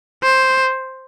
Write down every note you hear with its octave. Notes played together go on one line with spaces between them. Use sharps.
C5